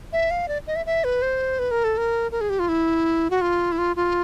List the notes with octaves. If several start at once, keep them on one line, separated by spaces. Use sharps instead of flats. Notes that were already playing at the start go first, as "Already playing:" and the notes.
E5
F5
D5
D#5
E5
E5
B4
C5
B4
A#4
A4
A#4
A#4
G#4
G4
F4
E4
F#4
F4
E4
F4
F4